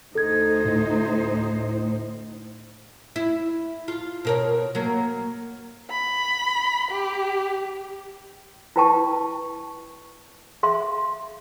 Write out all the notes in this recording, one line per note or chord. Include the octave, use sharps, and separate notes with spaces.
D2 D#4 A4 C5 G#6
A2
E4
F4
B2 A#4 C#5
F#3 A#3
B5
G4
E4 F4 B4 G5 A5 C#6
G#4 E5 F5 C6